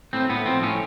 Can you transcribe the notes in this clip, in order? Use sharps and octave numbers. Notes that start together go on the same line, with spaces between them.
A2 C4
A2 B3
F3 C4
A2 C#4